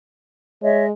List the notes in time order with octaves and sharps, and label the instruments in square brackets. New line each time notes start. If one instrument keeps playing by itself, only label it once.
[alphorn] G#3 [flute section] C#5 D#5 E5